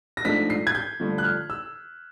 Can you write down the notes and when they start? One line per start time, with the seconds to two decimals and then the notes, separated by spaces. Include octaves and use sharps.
0.17 A#6
0.25 G#2 F3 A3 D4 B6
0.50 C7
0.67 G#6
0.75 G6
1.00 G2 D3 F3 A3
1.18 F#6
1.24 F6
1.50 E6